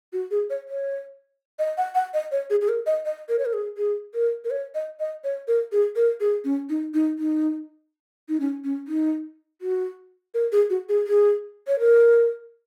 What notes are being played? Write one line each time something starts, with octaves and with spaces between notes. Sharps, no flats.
F#4
G#4
C#5
C#5
D#5
F#5
F#5
D#5
C#5
G#4
G#4
A#4
D#5
D#5
A#4
C#5
A#4
G#4
G#4
A#4
A#4
C#5
D#5
D#5
C#5
A#4
G#4
A#4
G#4
C#4
D#4
D#4
D#4
D#4
C#4
C#4
D#4
F#4
A#4
G#4
F#4
G#4
G#4
C#5
A#4